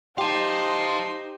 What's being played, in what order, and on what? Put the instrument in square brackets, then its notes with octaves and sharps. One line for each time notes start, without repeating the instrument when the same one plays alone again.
[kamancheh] D#4 C5 [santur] G4 [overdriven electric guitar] F5 A5 [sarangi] C6